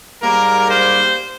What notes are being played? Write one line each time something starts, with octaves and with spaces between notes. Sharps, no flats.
G#2 G3 A#3 A#4
C5